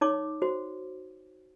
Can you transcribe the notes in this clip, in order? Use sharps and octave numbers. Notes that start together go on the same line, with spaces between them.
D#4 C#5 D6
F#4 C5